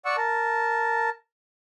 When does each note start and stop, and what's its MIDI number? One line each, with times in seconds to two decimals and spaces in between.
0.05 0.16 74
0.05 0.16 78
0.05 0.16 85
0.05 0.16 88
0.17 1.10 70
0.17 1.10 81